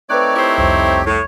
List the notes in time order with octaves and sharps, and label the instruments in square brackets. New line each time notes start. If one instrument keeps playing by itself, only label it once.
[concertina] A3 C4 D#4 [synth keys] B4 F#6 [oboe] C#5 [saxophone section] D5
[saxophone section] E4 G4 C5
[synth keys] C2 F2 [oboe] C#5
[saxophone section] A2 [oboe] C#5